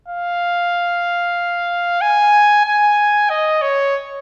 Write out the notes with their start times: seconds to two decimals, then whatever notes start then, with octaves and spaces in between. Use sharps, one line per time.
0.08 F5
2.01 G#5
2.66 G#5
3.30 D#5
3.62 C#5